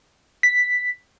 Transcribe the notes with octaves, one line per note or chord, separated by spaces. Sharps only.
B6